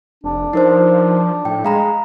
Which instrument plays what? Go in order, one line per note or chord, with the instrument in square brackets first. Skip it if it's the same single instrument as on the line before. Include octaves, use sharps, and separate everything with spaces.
[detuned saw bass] F1 [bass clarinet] D4
[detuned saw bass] F3 [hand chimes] D#4 A#4 C5
[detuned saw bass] A2 [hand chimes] G5
[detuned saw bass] G#3 [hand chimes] F5 A#5 B5